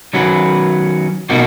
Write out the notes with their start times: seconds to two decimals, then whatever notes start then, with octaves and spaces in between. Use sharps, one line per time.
0.13 D#3 F#3 C#4 F#4 B4
1.30 B2 A#3 D#4 F#4